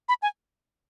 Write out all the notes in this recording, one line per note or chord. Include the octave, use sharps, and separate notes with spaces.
B5
G#5